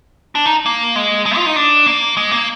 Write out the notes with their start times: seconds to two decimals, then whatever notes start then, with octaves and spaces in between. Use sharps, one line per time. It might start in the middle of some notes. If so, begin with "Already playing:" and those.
0.35 D4
0.46 D#4
0.66 A#3
0.96 G#3
1.26 G#3
1.36 F4
1.46 D#4
1.56 D4
1.86 A#3
2.17 G#3
2.31 A#3